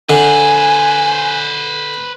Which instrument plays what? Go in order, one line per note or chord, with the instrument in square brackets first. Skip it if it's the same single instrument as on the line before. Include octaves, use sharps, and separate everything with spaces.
[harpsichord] D3 [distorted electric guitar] B4 C5 [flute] G#5